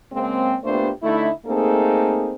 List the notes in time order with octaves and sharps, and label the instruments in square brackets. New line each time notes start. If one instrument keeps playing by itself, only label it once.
[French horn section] C#3 G#3 A#3 C4
A#2 A3 B3 D4 G4 C5
D3 A3 D#4 E4
A3 A#3 C4 D#4 G#4 A4